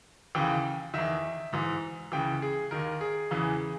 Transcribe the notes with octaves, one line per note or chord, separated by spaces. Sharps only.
D#2 C#3 E3 G5
E2 D#3 E5
G#2 E3
C#2 C#3 E3 G5
G#4
D#2 D#3 A#4
G#4
E2 C#3 E3